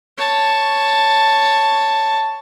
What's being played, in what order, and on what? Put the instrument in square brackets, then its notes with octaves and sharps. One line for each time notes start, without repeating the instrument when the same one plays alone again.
[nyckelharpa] C#5 A5